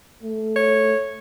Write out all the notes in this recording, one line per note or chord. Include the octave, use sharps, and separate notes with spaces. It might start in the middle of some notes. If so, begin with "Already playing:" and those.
A3
C#5